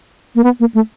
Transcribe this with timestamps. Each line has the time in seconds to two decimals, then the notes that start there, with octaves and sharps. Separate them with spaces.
0.35 A#3
0.44 B3
0.60 A#3
0.75 A3